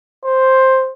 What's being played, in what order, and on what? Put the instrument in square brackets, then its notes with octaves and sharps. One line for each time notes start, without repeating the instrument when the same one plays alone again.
[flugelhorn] C5